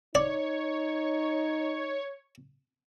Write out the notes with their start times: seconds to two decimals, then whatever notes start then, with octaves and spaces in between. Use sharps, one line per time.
0.15 D#4 C#5 D5